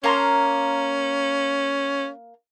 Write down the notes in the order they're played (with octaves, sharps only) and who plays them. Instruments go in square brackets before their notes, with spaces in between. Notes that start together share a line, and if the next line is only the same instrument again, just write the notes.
[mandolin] A#3 A#5 C6 [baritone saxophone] C#4